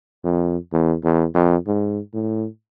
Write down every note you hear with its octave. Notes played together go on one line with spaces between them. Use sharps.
F2
E2
E2
F2
G#2
A2